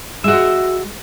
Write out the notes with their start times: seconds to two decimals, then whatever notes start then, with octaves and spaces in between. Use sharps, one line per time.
0.24 G#3 F#4 E5